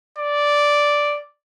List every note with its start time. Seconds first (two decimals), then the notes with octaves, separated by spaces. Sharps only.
0.18 D5